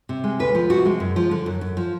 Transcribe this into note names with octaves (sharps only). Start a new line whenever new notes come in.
C3
G#3
D2 B4
F3
C3 F#4
G#3
F#2
F3
D3
F#2
F#2
F3